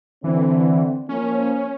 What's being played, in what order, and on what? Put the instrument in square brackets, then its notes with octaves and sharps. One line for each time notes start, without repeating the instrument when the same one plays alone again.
[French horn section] D3 C4 [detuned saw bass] E3
[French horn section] F3 A#3 [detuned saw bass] C#4